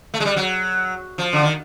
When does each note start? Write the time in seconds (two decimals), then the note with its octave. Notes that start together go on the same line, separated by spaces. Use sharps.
0.14 A3
0.20 G#3
0.25 G3
0.36 F#3
1.18 F3
1.33 D3
1.43 D#3